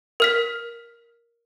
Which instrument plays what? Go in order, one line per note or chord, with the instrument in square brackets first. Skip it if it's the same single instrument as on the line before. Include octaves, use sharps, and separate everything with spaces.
[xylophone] A#4 F6 B6